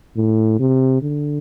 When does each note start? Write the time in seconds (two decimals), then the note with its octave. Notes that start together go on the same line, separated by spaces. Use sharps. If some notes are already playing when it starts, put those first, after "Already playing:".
0.17 A2
0.60 C3
1.02 D3